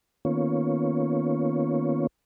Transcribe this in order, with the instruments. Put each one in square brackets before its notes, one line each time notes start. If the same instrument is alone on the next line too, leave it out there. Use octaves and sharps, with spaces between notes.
[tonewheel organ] D#3 A#3 B3 C#4 F4 C#5